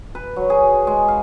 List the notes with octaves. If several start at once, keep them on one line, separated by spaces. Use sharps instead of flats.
B4
F#3
G#4
G#3
F5